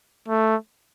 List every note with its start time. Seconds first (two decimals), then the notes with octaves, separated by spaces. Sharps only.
0.28 A3